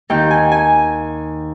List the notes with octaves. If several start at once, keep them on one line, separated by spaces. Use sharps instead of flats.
D#2 D#3 G5
G#5
G#5